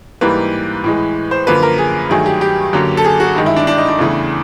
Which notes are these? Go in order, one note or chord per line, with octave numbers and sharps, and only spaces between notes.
G#2 E3 G3 A#3 B4
A2 E3 G#3
C5
F#2 D3 F3 A#3 B4
A#4
G#4
G2 D#3 F#3 A3 G#4
G4
G4
F#2 D3 F#3 A#3
A4
G#4
F#4
G2 D#3 G#3
E4
D4
D4
D#4
D4
E2 C#3 E3 A3